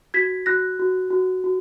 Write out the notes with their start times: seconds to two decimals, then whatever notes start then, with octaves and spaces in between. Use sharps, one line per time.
0.14 F#4 G#6 B6
0.46 F#4 F#6 A#6
0.79 F#4
1.11 F#4
1.44 F#4